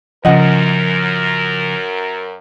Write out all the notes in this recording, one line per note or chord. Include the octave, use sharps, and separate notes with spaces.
F#2 C#3 F3 A#4 D#5 F#5